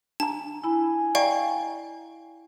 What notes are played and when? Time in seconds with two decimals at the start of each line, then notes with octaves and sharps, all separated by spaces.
0.20 D4 A5 A#5
0.64 E4 G#5 B5
1.15 D5 D#5 F5 G5 A#5 C#6